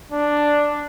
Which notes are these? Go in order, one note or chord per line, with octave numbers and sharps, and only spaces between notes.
D4